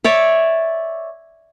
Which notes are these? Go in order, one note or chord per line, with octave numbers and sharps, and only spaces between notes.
C#5 D5 E5